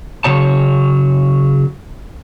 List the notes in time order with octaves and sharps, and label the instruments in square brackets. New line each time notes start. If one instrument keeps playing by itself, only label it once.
[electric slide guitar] C#3 F#3 C#5 A5